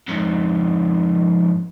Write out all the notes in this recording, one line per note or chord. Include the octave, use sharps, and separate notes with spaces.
F2 G#2